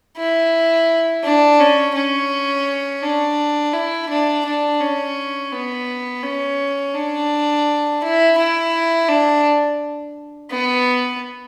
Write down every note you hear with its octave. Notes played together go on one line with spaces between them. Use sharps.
E4
D4
C#4
C#4
D4
E4
D4
D4
C#4
B3
C#4
D4
E4
E4
D4
B3